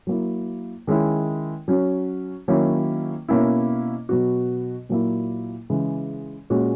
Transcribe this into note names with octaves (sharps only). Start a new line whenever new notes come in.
F#3 A#3 E4
D#3 G#3 C#4 E4
F#3 C#4 F#4
D#3 F#3 A#3 C#4 E4
B2 A#3 C#4 E4
B2 F#3 B3 F#4
A#2 F#3 A#3 E4
C#3 E3 G#3
A#2 G#3 C#4 F#4